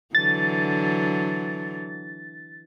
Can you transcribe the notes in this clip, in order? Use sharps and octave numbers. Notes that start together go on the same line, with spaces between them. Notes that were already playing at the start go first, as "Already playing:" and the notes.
D3 E3 F#3 A6